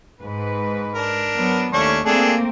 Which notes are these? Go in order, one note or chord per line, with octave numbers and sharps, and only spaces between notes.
G#2 B4
D4 A#4
F#3 B3
D#2 A3 C#4 D4 C#6
A3 A#3 C4 D4 G#4 A4